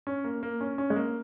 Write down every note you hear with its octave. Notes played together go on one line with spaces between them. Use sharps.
C#4
A#3
A#3
C#4
C#4
G#3
A#3